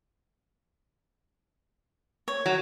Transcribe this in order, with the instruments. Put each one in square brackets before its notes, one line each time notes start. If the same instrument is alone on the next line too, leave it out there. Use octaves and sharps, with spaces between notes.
[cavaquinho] C#5
[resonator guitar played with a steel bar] F#3